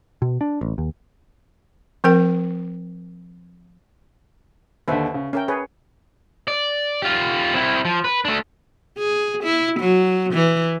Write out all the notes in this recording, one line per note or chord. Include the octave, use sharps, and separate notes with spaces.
B2
D4
A1
D#2
F3 C4 A#4 G5
D#2 D3 B4 C5 E5
C#3
C#4 A#4 E5 G5
G#4 B4 C#5
D5
F4 G4
C4 E4
F3
B4
A3 D4
G#4
E4
F#3
E3